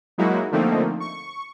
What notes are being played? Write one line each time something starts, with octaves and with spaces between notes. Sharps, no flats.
F#3 G#3 A#3 D#4 E4 F#4
D3 F3 A3 A#3 C4 D#4
C#6